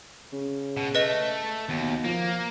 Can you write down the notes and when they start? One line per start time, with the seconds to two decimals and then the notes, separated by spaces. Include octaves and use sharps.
0.32 C#3
0.77 B2
0.95 A3 B4 D#5
1.69 D#2 B2
2.04 F3 A#3